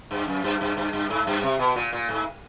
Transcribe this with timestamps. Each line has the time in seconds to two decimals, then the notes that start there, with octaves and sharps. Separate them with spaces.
0.11 G2
0.28 F#2
0.44 G2
0.61 G2
0.77 G2
0.93 G2
1.10 G#2
1.27 G2
1.43 C3
1.59 B2
1.76 A#2
1.93 A#2
2.09 G#2